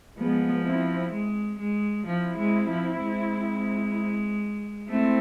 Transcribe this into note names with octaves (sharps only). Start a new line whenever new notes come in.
F3 G#3 B3
C4 E4
G#3
G#3
F3 C4 E4
G#3
F3
G#3
A3 C4 E4